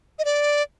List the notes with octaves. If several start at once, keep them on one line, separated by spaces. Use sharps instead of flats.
D#5
D5